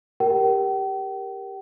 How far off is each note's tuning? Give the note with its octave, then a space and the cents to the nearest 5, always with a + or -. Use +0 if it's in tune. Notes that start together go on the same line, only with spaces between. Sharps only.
G4 +10 A#4 +5 G5 -45